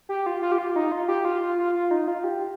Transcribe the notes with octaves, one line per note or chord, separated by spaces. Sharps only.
G4
F4
F4
G4
F4
D#4
F4
G4
F4
F4
F4
F4
D#4
F4
G4